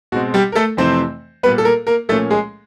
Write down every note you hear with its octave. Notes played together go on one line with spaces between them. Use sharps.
B2 G#3 C4 F#4
G3 G4
A#4
A3 A4
F2 C3 E3 A3 C4 C5
A#2 G3 B3 B4
A4
A#3 A#4
A#3 A#4
A#2 F3 A3 A#3 C#4 A4
G#3 G#4